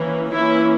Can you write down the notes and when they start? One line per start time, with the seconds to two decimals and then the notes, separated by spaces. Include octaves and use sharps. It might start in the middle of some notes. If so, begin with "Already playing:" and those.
Already playing: E3 A#3 C#4
0.31 E3 A#3 C#4 E4